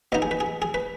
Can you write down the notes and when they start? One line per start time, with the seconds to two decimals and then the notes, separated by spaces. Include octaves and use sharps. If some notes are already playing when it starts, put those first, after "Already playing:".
0.12 B2 B3 D#4 D#5
0.22 G#4
0.31 B4
0.40 G#4
0.62 G#4
0.74 B4